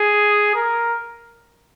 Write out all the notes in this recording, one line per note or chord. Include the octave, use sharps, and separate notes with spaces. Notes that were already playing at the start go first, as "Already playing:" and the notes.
Already playing: G#4
A#4